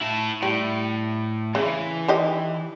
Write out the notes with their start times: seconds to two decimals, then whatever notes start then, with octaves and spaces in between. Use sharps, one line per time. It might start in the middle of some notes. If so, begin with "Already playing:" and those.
0.01 E4 A5
0.43 A2 G3
1.55 C#3 E3
2.08 D#3 G4 D#5